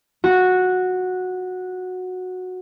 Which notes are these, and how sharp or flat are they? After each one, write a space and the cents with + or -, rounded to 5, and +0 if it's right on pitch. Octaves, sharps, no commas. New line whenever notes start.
F#4 -10